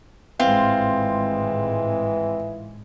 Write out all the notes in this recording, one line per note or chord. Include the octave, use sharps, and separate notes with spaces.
G#1 A2 E3 G#3 C4 F4